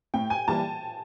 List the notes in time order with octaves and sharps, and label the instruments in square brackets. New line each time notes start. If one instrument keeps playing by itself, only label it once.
[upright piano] A2 [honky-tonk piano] G5
[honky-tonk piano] G#5
[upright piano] E3 G3 A#3 [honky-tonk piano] A5